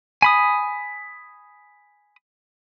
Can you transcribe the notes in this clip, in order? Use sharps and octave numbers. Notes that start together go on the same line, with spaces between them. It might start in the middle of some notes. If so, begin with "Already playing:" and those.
G#5 B5 D#6